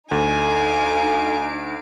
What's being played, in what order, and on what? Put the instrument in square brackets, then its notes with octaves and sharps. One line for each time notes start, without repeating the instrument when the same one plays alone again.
[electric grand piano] D2 [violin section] D#4 F5 D7 [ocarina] A4 [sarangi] G#5